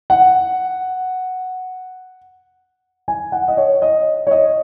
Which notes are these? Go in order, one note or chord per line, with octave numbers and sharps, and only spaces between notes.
F#5
G#5
F#5
D#5
C#5
D#5
C#5
D#5